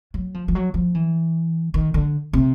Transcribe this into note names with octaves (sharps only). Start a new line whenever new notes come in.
F#3
F3
F3
F#3
F3
E3
D#3
D3
C3